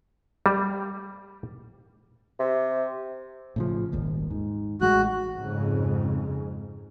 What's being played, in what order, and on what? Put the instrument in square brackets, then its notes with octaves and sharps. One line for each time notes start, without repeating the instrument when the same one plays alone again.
[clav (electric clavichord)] G3
[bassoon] C3
[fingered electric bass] A2 C#3 F3
D#1 G#1 D#2
G#2
[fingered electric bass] A1 G#3 [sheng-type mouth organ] F#4 F#6
[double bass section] F2 G#2 C#3